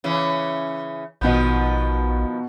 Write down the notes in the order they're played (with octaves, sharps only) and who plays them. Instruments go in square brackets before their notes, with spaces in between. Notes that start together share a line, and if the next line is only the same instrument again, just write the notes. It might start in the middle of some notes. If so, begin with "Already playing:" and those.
[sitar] C#3 E3 C#4
[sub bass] A#1 [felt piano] B2 G6 [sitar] D#3 F3 B3